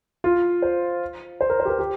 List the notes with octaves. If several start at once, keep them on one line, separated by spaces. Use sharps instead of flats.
F4
C5
C5
A#4
C5
G4
A#4
G4